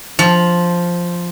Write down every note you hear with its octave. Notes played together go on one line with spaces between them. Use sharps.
F3